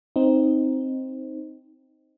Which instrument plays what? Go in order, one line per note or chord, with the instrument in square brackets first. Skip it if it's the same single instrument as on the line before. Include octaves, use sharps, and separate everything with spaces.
[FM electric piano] C4 D#4